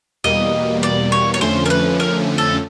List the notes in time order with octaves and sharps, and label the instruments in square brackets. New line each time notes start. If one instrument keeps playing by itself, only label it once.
[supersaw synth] E2 B2 G3 A#3 [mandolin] D#5
[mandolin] D5
C#5
C#5
[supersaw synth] F2 D3 F3 A3 C#4 [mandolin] C5
[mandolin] A#4
B4
A#4
A4